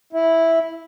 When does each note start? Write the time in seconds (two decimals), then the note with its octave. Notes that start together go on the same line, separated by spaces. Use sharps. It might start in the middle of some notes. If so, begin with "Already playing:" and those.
0.13 E4